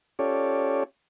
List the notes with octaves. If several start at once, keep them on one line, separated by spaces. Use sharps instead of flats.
C#4 F4 G4 A4 C#5 D5